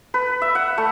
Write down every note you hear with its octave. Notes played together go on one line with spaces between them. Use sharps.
B4
E5
F#5
A3